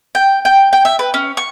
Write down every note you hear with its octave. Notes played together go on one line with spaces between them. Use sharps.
G5
G5
G5
E5
B4
C#4
C#6